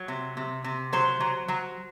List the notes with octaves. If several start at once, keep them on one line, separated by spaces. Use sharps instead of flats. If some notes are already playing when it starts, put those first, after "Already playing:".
Already playing: F#3
C3
C3
C3
F#3 C5
F#3
F#3